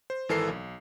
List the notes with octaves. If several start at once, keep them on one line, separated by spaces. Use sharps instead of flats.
C5
G#1 E3 A4 A#4 C7
B1